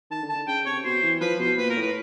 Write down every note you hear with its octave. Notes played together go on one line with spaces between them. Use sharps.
D#3 A5
D3
A5
D3
C#3 G5
C3 C#5
B2 C5
E3
F3 B4
B2 C5
A#2 B4
A#4
A2
B4